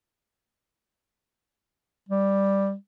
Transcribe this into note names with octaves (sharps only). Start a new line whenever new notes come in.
G3